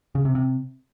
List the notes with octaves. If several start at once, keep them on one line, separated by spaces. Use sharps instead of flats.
C#3
C3
C3